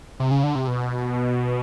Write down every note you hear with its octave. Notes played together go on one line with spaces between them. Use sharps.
C3
C#3
D3
C3
B2